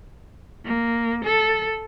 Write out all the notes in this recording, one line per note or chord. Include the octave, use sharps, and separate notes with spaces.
A#3
A4